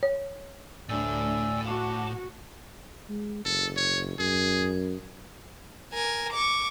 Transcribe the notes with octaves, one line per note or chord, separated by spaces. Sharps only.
C#5
D2 A2 D4 D5 G#5 E6
F#4 A5 D6
G#3
F#1 A4
C#5
F#2 G#4
A#4 G#5
C#6 D6